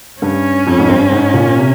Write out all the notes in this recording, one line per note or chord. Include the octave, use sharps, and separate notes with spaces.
G2 C#4
F2
G#2
G2
G#2
A#2
C3